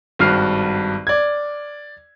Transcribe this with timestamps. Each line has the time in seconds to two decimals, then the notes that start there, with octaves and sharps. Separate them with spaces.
0.19 G#1 G2 F#4 F6 C7
1.07 D5 G#6